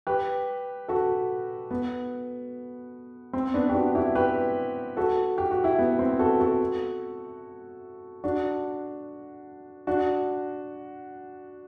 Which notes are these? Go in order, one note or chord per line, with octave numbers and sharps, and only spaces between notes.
G4 B4
F#4 A4
B3
C4
B3 D4
G4
D4 F#4
E4 G4
G4 B4
F#4 A4
G4
F#4
E4 G4
B3
C4
F#4 A4
F#4 A4
D4 F#4
D4 F#4